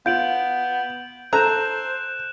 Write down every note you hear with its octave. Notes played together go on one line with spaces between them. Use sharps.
B3 F4 G6 D7 F#7
A4 C5 A#5 F#6 E7